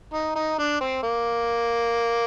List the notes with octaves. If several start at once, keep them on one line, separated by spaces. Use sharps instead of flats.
D#4
D#4
D4
C4
A#3